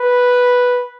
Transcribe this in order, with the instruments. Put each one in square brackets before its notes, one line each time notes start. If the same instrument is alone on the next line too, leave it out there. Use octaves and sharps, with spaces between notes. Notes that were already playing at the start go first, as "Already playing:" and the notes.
Already playing: [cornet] B4